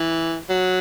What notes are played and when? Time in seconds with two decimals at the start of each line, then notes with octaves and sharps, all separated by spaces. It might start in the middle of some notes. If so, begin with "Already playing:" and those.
Already playing: E3
0.50 F#3